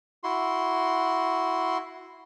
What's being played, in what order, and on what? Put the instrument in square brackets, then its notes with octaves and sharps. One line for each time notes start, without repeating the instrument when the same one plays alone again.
[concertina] E4 F#4 C6